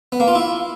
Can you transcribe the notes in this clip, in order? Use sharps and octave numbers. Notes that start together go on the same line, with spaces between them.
B3
A#3
F4
E4